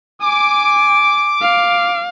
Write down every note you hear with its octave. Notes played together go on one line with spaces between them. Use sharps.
G#5 D6
F5